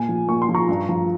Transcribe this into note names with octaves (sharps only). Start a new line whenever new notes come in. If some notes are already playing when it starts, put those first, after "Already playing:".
Already playing: A#2 G#5
F3
A#2 C#6
C6
F3
A#5 C#6
G2
F3